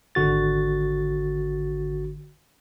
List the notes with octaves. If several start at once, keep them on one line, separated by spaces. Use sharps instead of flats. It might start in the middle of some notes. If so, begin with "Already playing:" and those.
G#1 D3 F#4 A6